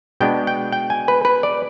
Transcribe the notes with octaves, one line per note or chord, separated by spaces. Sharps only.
B2 G#3 B3 D4 G5
G5
G5
G#5
B4
B4
D5